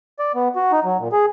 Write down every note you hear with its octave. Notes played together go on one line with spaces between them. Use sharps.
D5
B3
F#4
D#4
F#3
A#2
G#4